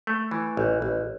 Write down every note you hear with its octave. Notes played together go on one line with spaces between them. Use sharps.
A3
E3
A1
A1